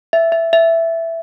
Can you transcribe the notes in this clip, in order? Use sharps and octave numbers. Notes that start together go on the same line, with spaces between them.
E5
E5
E5